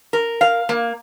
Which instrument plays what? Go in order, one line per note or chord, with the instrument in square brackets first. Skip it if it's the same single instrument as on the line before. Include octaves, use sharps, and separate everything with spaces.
[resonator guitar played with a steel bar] A#4
F5
A#3